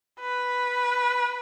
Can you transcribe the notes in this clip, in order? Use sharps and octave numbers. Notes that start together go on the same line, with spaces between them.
B4